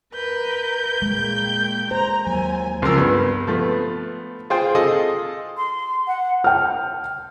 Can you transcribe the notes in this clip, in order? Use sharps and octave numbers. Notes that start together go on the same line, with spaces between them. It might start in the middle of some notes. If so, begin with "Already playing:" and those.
A#4 B4 G6
A#2 G#3 G5
C5 A#5
D#2 F#3 G#5
C#2 F3 A#4 E6
G2 B3
F3 A3 B3
F4 G#4 C5 G5
F4 G#4 A4 D#5
C6
F#5
G5 F6